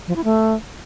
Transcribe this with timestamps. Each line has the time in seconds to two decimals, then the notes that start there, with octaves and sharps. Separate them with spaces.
0.08 F3
0.16 E4
0.24 A3